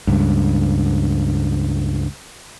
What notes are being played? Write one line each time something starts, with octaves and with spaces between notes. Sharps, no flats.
C#2 G2